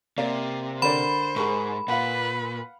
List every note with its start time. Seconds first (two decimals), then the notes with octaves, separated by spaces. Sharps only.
0.18 C3 A#3 D5 F5
0.82 D3 A#4 C5 D5 B5
1.36 G#2 G#4 A#4 C#6
1.88 A#2 B4 F5 F#5